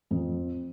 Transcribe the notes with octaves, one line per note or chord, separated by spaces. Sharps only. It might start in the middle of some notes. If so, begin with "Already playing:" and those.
F2